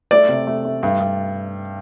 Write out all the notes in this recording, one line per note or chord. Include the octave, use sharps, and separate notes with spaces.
A3 D5
C3
A3
A3
G2
G2